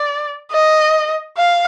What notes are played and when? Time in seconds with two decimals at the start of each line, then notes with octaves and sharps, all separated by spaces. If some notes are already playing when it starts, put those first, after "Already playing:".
Already playing: D5
0.52 D#5
1.37 F5